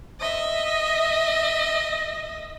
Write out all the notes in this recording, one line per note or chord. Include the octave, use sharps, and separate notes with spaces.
D#5 E5